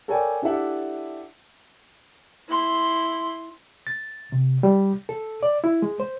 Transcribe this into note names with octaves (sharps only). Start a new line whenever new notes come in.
A4 A#4 C#5 D5 G5 G#5
D4 E4 G4 A4 E5 F#5
E4 C6
A6
C3
G3
A4
D5
E4
G#3
C5